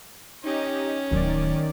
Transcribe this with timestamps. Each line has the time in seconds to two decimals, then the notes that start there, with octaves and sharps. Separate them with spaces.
0.44 C#4 D#4 G4 D#5
1.11 D1 D#3 F#3 D5